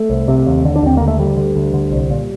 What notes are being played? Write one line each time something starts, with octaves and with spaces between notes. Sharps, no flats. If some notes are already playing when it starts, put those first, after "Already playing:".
Already playing: A3
C2
C3
D#2
D3
D4
D#2 C4
D3 A#3
A3
D2 G3
D3
D2
D3
C2
A#2